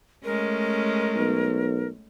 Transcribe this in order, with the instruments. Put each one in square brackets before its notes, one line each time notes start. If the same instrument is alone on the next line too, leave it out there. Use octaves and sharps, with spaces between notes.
[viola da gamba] G#3 A3 C#4 [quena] A#4
[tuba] B1